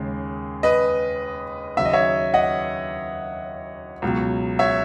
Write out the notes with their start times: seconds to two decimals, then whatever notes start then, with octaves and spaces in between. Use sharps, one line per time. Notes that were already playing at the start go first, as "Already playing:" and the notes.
Already playing: D#2 C#3 G#3
0.63 B4 D#5
1.77 D#2 C#3 F#3 E5
1.85 D#5
1.93 C#5 E5
2.34 D#5 F#5
4.02 C#2 B2 F#3
4.59 C#5 E5